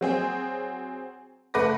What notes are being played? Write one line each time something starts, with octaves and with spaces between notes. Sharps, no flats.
F#3 C4 G#4
F#1 A3 B4 F#5 D6 A#6